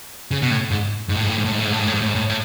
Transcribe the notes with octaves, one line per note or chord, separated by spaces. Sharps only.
C#3
B2
A2
G#2
G#2
A2
G#2
A2
G#2
A2
G#2
A2
G#2
A2
G#2
A2
G#2
A2
G#2
A2
A2